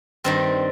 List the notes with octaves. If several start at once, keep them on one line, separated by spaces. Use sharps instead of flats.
G2 D#3 G3 C4